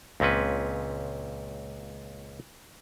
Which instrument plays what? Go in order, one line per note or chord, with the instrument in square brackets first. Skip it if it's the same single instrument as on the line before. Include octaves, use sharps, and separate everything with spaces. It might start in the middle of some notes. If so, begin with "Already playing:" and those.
[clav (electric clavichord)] C#2 A#2 C4 C#4 B4